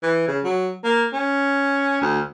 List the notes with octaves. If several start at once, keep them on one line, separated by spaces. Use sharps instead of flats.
E3
C#3
F#3
A#3
C#4
D2